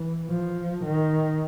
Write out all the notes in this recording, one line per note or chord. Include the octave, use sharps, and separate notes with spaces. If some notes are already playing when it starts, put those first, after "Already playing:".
Already playing: E3
F3
D#3